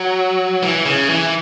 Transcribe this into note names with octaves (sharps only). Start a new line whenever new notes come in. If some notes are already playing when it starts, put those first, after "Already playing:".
Already playing: F#3
E3
C#3
E3